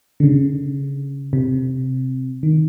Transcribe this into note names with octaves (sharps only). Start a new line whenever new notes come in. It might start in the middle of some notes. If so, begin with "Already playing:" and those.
D3
C#3
C3
D#3